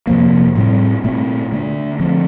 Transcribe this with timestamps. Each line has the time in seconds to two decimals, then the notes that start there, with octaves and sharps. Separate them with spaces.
0.07 F2 C3 F3 A#3
0.55 A2 G3 C4
1.04 A#2 A3 C4
1.52 D3 A3 D4
2.00 D3 F3 C4